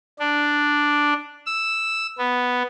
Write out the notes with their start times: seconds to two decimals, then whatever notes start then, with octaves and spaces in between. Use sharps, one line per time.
0.19 D4
1.46 E6
2.18 B3